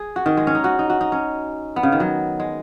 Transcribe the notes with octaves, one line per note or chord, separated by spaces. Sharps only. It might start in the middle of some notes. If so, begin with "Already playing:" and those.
Already playing: G#4
F#4
D#3
G#3
C#4
D#4
F#4
D#4
F#4
D#4
C#4
B3
C#3
D#3
F#3
G#3